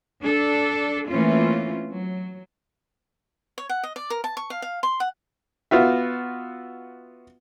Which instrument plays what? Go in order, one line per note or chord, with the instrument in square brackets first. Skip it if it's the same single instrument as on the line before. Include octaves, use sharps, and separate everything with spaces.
[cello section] D4 A4
E3 A3 A#3 C4 C#4 F4
F#3
[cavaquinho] C#5
F#5
D#5
D5
A#4
A5
C#6
F5
F5
C6
F#5
[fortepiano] B3 F4 F#4 E5